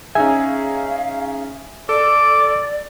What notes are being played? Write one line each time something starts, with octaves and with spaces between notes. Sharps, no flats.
C#4 D#4 G#4 E5 F5 G#5
A4 D5 D6